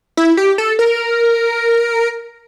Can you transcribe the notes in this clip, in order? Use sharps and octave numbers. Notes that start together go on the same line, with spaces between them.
E4
G4
A4
A#4